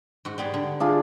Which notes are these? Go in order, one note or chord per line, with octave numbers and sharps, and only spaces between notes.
G#2 F#4
G3 B3 G#4
D3
D4 F4 G#4